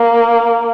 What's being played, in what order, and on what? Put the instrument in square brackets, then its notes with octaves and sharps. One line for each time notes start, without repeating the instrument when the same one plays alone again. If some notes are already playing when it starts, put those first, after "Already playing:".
Already playing: [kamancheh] A#3